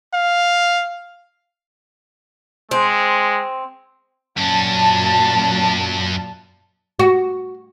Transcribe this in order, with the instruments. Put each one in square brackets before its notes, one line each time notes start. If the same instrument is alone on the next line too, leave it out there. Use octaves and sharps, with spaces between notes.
[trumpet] F5
[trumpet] G#3 [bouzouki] C4
[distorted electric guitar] F#2 C#4 [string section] A#2 F#3 A5
[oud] F#4